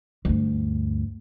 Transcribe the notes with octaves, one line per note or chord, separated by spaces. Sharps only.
D2 G2